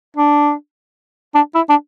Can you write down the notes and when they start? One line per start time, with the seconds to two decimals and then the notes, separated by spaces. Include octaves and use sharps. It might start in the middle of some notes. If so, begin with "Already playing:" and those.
0.16 D4
1.35 D4
1.55 E4
1.70 D4